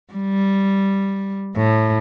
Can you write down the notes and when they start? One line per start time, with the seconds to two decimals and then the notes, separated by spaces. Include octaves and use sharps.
0.13 G3
1.57 A2